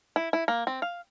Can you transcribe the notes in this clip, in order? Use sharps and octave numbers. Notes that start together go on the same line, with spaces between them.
E4
E4
A#3
C4
F5